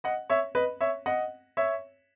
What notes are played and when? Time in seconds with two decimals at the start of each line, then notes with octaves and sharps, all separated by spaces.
0.04 D#5 F#5
0.30 C#5 E5
0.55 B4 D#5
0.81 C#5 E5
1.06 D#5 F#5
1.57 C#5 E5